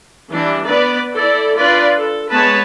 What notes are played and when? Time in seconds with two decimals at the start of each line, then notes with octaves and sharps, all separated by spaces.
0.31 E3 G3 D4
0.66 B3 B4 D5
1.13 E4 A4 D5
1.57 D4 F4 B4 D5
1.98 A4
2.32 G#3 B3 B4 C#5 A5